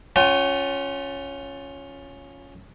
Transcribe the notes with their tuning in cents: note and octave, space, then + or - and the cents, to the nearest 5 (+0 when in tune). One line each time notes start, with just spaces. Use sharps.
C#4 +0 F4 +15 G5 -45